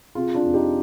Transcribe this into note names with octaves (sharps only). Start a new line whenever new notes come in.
C3 F4 G#4
D4 F4
F2
D#4 G4